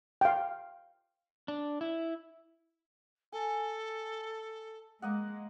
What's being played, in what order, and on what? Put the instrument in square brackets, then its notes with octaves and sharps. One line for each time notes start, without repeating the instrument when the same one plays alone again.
[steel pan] F5 G5
[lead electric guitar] D4
E4
[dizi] A4 [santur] G#5
[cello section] G#3 [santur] A#3 D#5 F#5